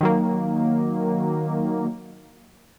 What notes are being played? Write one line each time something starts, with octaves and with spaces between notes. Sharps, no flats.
D#3 F#3 A#3